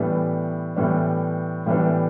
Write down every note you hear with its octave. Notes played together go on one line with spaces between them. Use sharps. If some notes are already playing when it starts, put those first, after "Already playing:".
Already playing: A2 E3 G3 B3 D4
A2 E3 G3 B3 D4
A2 E3 G3 B3 D4